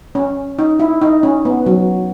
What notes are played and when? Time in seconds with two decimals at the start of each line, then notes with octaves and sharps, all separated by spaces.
0.15 C#4
0.59 D#4
0.80 E4
1.01 D#4
1.23 C#4
1.45 B3
1.66 F#3